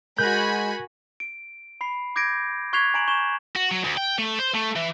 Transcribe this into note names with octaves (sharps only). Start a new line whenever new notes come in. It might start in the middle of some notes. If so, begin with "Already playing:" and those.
G#3 F#4 A#4 G#5 B5 F#6 G6 A#6
D7
B5 C7
D6 G6 G#6 A#6 C7 D7
C#6 F#6 G#6 B6 C7 F7
G#5 A#5 D7 F#7
C#6 G6 E7
F#4
F#3
D2
G5
A3
C5
A3
E3